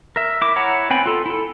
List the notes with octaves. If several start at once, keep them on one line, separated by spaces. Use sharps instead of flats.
A#4 E5
E4 D6
E4 C#5 F#5 A#5
B3 C4 G5 G#5 B5
F4 A4
E4 A4